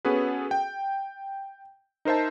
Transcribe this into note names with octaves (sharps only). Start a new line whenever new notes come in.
B3 C#4 F#4 G#4 A4 B4
G5
D#4 A#4 C5 E5 A5